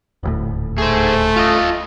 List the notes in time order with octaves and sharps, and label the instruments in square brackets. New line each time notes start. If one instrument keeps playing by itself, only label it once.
[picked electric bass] D#1 D2 A2
[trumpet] A3 [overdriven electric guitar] G#4 C5
[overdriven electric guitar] F4 D#5